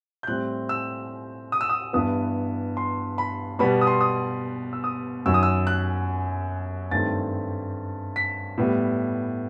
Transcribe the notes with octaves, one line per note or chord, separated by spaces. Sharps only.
G6
A2 G3 C4 F#6
E6
D#6
E6
D#6
G2 E3 B3 D#6
C6
B5
B2 G3 B3 B5
D#6
C6
D#6
E6
D#6
F#2 D#3 F#3 E6
D#6
E6
F#6
G2 D#3 A3 C4 A6
B6
A2 G3 B3